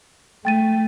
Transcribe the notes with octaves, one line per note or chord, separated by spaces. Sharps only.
A3 G5 A6 D#7